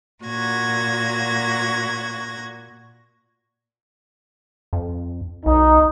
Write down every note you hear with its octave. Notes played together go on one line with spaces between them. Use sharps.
A#2 F#4 G#6 A#6
F2
B1 D#4